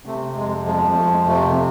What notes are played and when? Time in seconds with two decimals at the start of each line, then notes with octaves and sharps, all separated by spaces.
0.05 C3 A3
0.35 F2 G#3
0.66 F3 G#3
0.74 G3
0.81 G#3
0.95 F2 A3
1.11 G#3
1.26 C3 A3